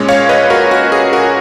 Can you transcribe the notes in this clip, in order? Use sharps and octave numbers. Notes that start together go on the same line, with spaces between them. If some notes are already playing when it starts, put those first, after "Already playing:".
Already playing: A#2 G#3 C#4
C#5 F5
B4 D#5
F#4 A#4
F#4
G#4
F#4 A#4